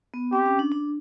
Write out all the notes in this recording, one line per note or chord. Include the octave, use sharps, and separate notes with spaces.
B3
C4 G4
C#4
D4
D4